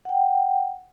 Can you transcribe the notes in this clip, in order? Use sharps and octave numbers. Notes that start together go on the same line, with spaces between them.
F#5 G5